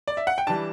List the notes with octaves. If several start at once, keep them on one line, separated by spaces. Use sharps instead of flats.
D5
E5
F#5
G5
E3 G3 D4 A5